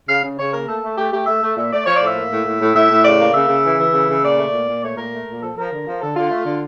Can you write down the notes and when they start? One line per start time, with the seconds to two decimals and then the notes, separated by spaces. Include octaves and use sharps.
0.09 C#3 F5
0.23 C#3
0.38 C#3 C#5
0.53 A#3 A#4
0.68 A3 A4
0.83 A3
0.97 A3 G4
1.12 A3 G4
1.27 A3 E5
1.42 A3
1.56 A#2 E5
1.71 A3 D5
1.86 F3 C#5
1.97 A2 D5
2.06 E5
2.16 A#3
2.31 A2
2.46 A2
2.60 A2
2.75 A2 E5
2.90 A2
3.05 C#3 D5
3.20 A#3
3.34 C#3 E5
3.49 C#3
3.64 E3
3.79 E3
3.93 C#3
4.09 C#3
4.23 A#2 D5
4.38 A3
4.53 A#2
4.68 A#2
4.83 A3 C#5
4.97 A#2 A#4
5.12 A3
5.27 A#2
5.41 F3 A4
5.57 F3 A#4
5.71 D3
5.86 F3
6.01 D3 A4
6.15 D3 F4
6.31 A3
6.45 D3